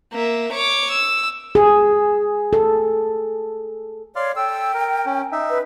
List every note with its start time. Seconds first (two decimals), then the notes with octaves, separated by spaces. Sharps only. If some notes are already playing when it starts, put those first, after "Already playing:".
0.12 A#3 E5
0.53 C#5 D6
0.91 E6
1.55 G#4
2.53 A4
4.16 C#5 D5 F5 C6
4.36 A4 G5 E6
4.74 A#4
5.06 C#4
5.32 D#4 E5
5.50 B4